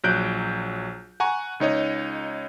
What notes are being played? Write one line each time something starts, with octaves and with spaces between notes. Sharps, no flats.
A#1 F#3 F#6 G6 D7
F#5 G#5 A#5 C#6
C#2 D#4 C#5 D#5